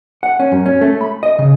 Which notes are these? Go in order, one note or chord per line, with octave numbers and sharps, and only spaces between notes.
F#5
C#4
F#2
C#4
A3
B5
D#5
C#3